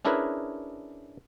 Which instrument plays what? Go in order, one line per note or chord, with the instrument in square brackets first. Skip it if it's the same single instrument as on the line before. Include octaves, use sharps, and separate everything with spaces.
[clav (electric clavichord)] C#4 D4 E4 G#4 A#4 B4